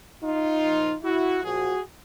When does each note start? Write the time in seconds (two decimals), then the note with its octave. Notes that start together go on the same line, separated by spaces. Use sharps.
0.22 D#4 F4
0.63 A#2 F3
1.03 E4 F#4
1.44 A#2 F3 F#4 G#4